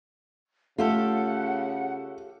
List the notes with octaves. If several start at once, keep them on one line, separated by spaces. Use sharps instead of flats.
C#3 A3 F4 G4 A4 F#5